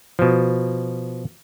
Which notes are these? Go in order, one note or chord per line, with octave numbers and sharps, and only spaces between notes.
B2 F3